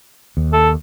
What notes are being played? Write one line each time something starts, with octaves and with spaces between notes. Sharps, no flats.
D#2
A4